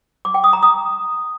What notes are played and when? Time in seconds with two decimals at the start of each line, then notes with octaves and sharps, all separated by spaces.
0.25 D6
0.34 G5
0.44 D#6
0.53 A#5
0.63 D#6